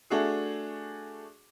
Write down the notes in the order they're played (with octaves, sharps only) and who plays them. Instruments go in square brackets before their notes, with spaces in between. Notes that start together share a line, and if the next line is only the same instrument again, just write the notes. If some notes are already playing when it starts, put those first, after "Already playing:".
[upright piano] A3 D4 F#4 G#4